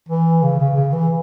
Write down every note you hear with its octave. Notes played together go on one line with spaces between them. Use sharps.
E3
C#3
C#3
C#3
E3